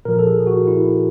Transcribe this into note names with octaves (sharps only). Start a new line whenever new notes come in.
A#2 F3 A#4
A4
G#4
F#4
E4